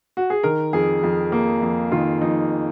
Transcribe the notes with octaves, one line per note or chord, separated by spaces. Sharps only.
F#4
G#4
D#3 A#4
F2 G#4
F2
A#3
F2
D#3 F4
F2 D#4